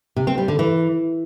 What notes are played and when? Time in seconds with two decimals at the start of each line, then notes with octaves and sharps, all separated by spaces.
0.16 C3
0.27 C4
0.38 G3
0.48 D3
0.59 E3